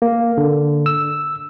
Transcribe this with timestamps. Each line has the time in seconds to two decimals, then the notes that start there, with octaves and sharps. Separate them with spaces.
0.02 A#3
0.37 D3
0.86 E6